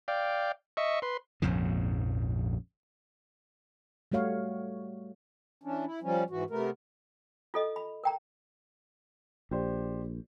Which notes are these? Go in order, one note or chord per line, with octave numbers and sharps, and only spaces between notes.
D5 F5 G5
D#5 E5 C#6
B4 C6
A#1 F2 G#2 C#3
G3 A3 F#4 C#5 F5
E3 C#4 D4
E4
F3 G3 C#4
G#2 E3 F#4
C3 A3 B3 A#4
F4 A4 D#5
B5
A#4 G5 A#5
A#1 G4 C5 D5